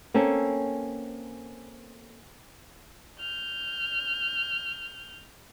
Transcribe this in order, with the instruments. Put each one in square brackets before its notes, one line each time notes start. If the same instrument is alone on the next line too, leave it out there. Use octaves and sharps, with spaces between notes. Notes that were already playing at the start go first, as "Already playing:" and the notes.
[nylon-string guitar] A#3 C4 C#4 A4
[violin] F6 G6